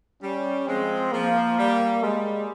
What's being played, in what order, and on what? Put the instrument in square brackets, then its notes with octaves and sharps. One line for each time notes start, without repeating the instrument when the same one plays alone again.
[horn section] G3 [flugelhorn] C#4
[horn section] F3 G#3 [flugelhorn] C4
[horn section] F3 [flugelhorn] A#3
[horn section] G3
[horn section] G3 [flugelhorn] G#3